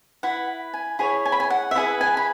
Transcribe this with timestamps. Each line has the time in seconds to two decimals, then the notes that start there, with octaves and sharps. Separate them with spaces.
0.23 E4 B4 F#5
0.74 G#5
0.99 E4 G#4 C#5 B5
1.25 G#5
1.32 B5
1.40 G#5
1.50 F#5
1.71 E5
1.75 E4 G#4 B4 F#5
2.01 G#5
2.17 B5